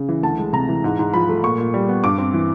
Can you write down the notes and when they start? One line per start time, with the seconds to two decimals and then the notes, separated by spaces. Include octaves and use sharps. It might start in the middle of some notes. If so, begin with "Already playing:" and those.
Already playing: C#3
0.09 E3
0.23 D2 A5
0.38 G#3
0.53 C3 A#5
0.69 E3
0.84 G#2
0.99 G#2
1.14 F3 B5
1.29 A3
1.43 A#2 C#6
1.58 A#2
1.74 G3
1.89 B3
2.04 G2 D6
2.18 C4
2.34 E3